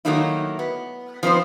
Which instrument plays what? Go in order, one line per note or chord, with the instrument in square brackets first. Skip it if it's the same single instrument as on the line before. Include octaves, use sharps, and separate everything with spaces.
[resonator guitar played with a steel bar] D#3 F#3 A3 A#3 D#4 E4
B3
F3 G#3 B3 C4 D#4 C5